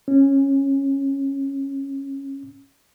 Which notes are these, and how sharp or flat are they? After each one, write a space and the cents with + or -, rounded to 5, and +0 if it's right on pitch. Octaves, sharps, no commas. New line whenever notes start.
C#4 -15